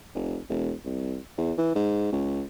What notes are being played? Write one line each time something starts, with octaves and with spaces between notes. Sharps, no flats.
F1
E1
C2
E2
E3
G#2
C#2